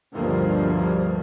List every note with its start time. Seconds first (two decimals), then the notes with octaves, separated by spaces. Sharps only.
0.14 D2 G2 B2 F3 A#3